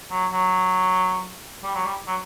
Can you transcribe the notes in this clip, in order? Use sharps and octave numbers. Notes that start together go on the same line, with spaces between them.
F#3
F#3
G3
F#3
G3
F#3